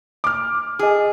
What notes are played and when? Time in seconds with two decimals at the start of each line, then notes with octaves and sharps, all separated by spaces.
0.24 D6 F6
0.79 G#4 D#5 G#5